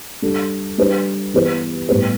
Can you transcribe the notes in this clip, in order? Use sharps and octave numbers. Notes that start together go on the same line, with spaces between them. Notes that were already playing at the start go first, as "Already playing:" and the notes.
G3 D4 A4
G3 D4 B4
E3 B3 G4 B4
A2 G3 B3 G4 B4